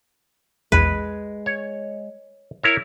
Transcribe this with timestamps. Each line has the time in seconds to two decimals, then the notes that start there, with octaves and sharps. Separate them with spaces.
0.72 A#1 E2 G#3 B4 F#6
1.46 C#5
2.63 E4 A#4 C#5